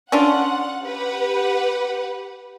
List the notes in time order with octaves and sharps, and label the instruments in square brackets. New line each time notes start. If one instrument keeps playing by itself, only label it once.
[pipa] C#4 D4 F4 [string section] F#5
[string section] G4 B4 F#5